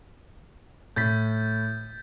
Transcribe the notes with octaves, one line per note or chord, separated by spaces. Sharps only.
A2 G6 A6 B6